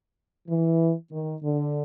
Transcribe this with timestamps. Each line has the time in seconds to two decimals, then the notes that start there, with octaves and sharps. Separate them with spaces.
0.49 E3
1.12 D#3
1.43 D3